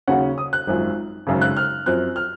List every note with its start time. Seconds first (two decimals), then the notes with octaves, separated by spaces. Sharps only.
0.08 D#2 C#3 F#3 C#4 F#5
0.38 D#6
0.53 F#6
0.67 G#1 F#2 F3
1.27 G#1 F#2 C#3
1.41 F#6
1.57 F6
1.86 F#2 F3 C4 F#6
2.16 F6